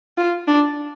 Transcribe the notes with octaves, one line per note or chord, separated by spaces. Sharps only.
F4
D4